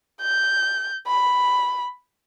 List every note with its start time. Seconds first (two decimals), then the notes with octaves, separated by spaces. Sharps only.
0.21 G6
1.07 B5